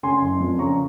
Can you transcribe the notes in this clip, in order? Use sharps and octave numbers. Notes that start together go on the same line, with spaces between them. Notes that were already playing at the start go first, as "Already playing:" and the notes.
C#3 G#5 C6
F#1
F2
C#3 A#5 C#6